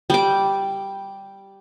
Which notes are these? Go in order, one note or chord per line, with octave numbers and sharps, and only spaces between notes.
G3 D6